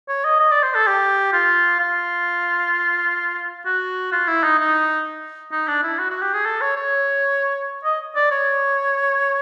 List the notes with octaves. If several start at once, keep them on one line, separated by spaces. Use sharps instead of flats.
C#5
D#5
D#5
D5
C5
A4
G4
F4
F4
F#4
F4
E4
D#4
D#4
D#4
D4
E4
F#4
F#4
G4
G#4
A4
C#5
C#5
D#5
D5
C#5